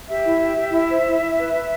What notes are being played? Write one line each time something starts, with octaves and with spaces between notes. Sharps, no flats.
G4 E5
E4
G4
G4
E4
C5
E4
E4
B4
B4